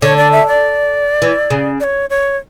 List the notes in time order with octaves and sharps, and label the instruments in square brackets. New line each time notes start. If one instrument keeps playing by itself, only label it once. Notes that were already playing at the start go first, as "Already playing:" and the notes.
[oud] D3 [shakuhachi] C#5
[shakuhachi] D5
E5
D5
[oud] E3
C#3
[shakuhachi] D5
C#5
C#5